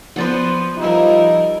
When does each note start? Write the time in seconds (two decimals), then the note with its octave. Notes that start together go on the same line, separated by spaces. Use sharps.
0.16 F3 B3 B4 C5 D5 F#5
0.78 F3 G3 D#4 E4 A#4